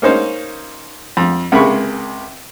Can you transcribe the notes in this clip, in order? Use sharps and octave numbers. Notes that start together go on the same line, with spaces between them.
A#3 C#4 D#4 C5
F2
C#2 C3 A#3 G#4 B5 C#6